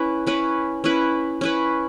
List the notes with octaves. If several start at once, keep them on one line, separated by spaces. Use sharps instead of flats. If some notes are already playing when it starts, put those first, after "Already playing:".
Already playing: C#4 E4 B4
C#4 E4 B4
C#4 E4 B4
C#4 E4 B4